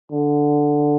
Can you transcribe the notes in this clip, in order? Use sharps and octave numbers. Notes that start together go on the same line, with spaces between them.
D3